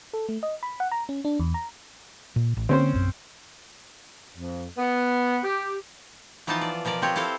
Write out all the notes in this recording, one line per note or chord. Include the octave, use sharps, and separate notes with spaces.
A4
A3
D#5
B5
F#5
A#5
C#4
D4
E2
A#5
A#2
A1
D3 A#3 C4 C#4 C5
A#1 F#2
F2
B3
G4
E3 F3 B3 D#4 F4 A5
D5
B2 F3 A#4 D5
F3 C4 G4 C#5
E4 A4 C5 F5 G5